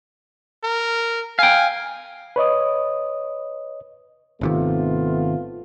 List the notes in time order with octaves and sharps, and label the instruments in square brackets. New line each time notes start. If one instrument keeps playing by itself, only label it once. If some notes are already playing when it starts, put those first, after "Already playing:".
[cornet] A#4
[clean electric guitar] F5 G5 [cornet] G#5
[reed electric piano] B4 C#5 D#5 D#6
[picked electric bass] G#1 C3 D#3 [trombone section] A3 B3 F4